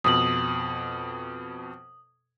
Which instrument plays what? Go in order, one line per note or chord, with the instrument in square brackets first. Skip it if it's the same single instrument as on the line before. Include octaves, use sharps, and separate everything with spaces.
[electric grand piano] F2 B2 [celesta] D#6 F#7